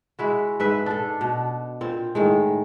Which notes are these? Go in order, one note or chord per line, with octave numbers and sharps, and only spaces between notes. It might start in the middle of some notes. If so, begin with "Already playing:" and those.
G#3 E4 F#4
G#2 B4 E5
D4 A4
B2
A#2 C4
A2 D#3 G#3